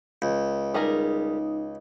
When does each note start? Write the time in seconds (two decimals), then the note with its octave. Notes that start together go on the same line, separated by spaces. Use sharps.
0.22 C#2
0.74 G3 D#4 G#4 A#4